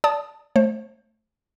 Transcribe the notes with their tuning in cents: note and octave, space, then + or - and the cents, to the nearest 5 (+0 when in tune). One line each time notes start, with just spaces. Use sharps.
D5 -25 A5 +0 D#6 +0
A3 -10 C5 +30